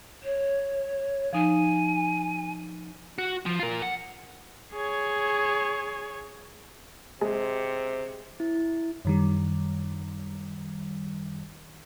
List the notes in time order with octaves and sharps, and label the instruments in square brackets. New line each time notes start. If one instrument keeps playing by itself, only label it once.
[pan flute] C#5
[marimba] F3 D#4 [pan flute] G#5
[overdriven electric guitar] F#4
F3
F4 A#4
F#5
[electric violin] G#4 C#5
[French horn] C3 [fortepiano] G#3
[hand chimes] E4
[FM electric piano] F#2 D#3 G3